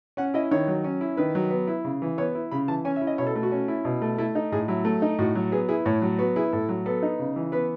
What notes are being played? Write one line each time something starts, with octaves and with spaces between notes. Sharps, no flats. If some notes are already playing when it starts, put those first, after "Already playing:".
C#4 F#5
E4 D#5
D#3 C#5
F#3
C#4
E4
D#3 B4
F#3
B3
E4
C#3
E3
B3 C#5
E4
C#3 B5
E3 A5
C#4 G#5
E5
E4
D#5
B2 C#5
A4
A3
F#4
C#4
E4
B2
A3
A3 E4
D#4
A2 G#4
F#3 E4
A3
D#4
A2 F#4
F#3
B3 G#4
E4 G#4
A2 C#5
F#3
B3 F#4
E4 G#4
A2 A4
F#3
B3 A4
D#4
C#3
E3
B3 B4